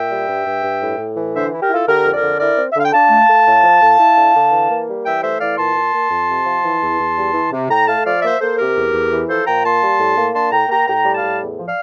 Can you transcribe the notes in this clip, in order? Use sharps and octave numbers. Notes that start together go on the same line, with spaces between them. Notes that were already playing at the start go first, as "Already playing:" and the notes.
Already playing: A#2 E5 G5
G3
G2
G2
G2
A2
A2
E3
D3 C5 E5
E4
G4 A#4
E4 F4 A4
D3 G4 A#4
F2
A#4 D5
D3
E4 A#4 D5
C4
E5
D3 F5
G5
D4 F5 A5
A3
A3
A2
F3
A2
E4
D3
D3
E3
A#3
G3
E3 E5 G5
A3 C5 E5
E3 D5 F5
A#2 A5 C6
A#2
A#3
F2
C3
F3
E3
E2
E2
G3
E3
C3
A2 G5 A#5
A3 F5 A5
F3 D5 F5
A#3 C5 E5
A#3 A4 C5
C3 G4 A#4
E2
E2
E3
F3 A4 C5
A#2 G5 A#5
A#3 A5 C6
G3
A2
A#3
D4 A5 C6
A2 G5 A#5
A#3 G5 A#5
A2 G5 A#5
G3
F5 A5
A2
E2
F3
D5 F5